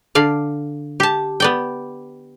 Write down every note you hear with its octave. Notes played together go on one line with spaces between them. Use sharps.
D3 D5 F5
G4 A5
B3 D5 G5